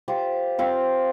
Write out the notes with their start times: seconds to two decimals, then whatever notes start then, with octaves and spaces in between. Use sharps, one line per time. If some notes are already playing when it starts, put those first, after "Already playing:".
0.08 F4 G4 C5 G5
0.58 C4 F4 F5